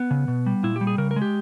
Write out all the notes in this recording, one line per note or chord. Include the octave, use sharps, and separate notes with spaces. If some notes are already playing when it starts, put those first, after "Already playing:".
Already playing: B3
C#3
B2
G3
A#2 E4
G4
G3
G#4
C#3 A#4
A#4
G#3
G4